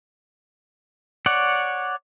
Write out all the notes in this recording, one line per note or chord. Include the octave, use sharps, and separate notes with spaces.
C#5 D5 F#5